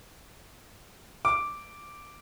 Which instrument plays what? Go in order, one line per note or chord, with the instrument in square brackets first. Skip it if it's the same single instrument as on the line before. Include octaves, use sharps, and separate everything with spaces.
[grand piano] D6